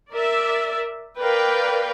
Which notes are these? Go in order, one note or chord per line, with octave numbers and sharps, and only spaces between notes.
A#4 D5 E5
A#4 B4 D5 F5 G5